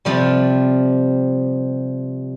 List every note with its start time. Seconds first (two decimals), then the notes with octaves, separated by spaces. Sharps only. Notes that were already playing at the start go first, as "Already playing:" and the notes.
0.05 C3 F3 G3